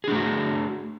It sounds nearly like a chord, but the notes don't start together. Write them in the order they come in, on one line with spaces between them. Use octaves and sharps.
G#4 D4 A3 F#4